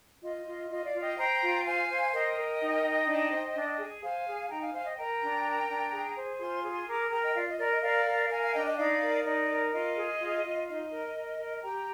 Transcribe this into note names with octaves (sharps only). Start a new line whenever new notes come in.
F4 D#5
F4
F4 D#5
D5 F5
F4
D#5 G5
C5 G5 A#5
F4
C5 F5 G#5
C5
A#4 D#5 G5
A#4
D#4
D#4
D4
C5
D4
G#4
C5 F5 G#5
G#4
D#4 G5 A#5
F5 G#5
C5 F5 G#5
D#5 G5
A#4 G5 A#5
D4
A#4
D4
G#4
C5
F4 G#5 C6
G#4
A#4 A#5 D6
A#4 G5 A#5
D#5 G5
F4 D5 F5
D#5
A#4 D5
D#5
A#4 D5 F5
A#4
A#4 F5 G#5
F5 G#5
D4 D#5 G5
D#5 G5
D#4 D5 F5
A#4
D#4 D5
A#4
F4 D#5
G#4
F4
F4
D#4 D#5
A#4
A#4
A#4
G4 G5 A#5